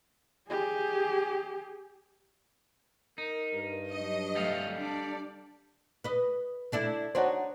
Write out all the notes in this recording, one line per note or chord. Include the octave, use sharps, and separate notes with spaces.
G4 G#4
D#4 A#4
G2
F#3 D4 D#5
G3 A3 A4 F5
D4 D5
B4 D#5
A3 D4 E4
D4 D#4 F#4 C5 C#5 F#5